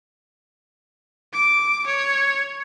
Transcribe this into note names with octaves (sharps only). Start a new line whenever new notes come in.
D6
C#5